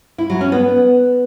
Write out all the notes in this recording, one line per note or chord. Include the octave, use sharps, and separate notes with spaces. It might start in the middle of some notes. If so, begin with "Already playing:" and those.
E4
F#3
C#4
B3